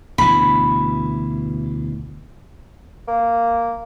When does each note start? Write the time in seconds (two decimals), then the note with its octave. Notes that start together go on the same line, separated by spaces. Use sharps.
0.18 D2 B2 E3 B5
3.08 A#3